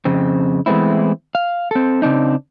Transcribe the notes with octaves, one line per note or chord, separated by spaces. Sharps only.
F2 C#3 C4
E3 G#3 A3 B3 C4 E4
F5
C4 A4
C#3 C4 D4 D#4